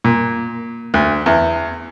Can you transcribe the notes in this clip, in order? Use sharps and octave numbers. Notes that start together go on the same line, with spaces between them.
A#2
D2
E2